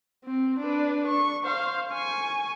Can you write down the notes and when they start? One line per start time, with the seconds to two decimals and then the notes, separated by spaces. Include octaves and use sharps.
0.25 C4
0.60 D4 B4
1.07 C#6
1.44 C5 F5
1.90 G#5 C#6